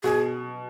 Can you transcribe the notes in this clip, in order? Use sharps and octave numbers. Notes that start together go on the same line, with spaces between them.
B2 G#4